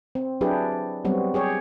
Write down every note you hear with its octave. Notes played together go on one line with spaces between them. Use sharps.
C4
F#3 D4 E4 G4 G#4 B4
F#3 G3 B3 C4 F#4
G4 G#4 C#5